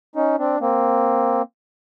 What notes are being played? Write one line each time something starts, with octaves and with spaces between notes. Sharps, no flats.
C#4 D#4
C4 D4
A#3 C4